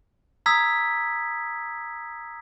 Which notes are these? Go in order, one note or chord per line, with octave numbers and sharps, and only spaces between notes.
A#5 D#6 E6 G#6 B6